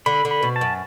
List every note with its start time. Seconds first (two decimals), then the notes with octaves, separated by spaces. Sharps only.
0.06 D3 B5
0.25 D3
0.31 B5
0.43 B2
0.56 A5
0.61 F#2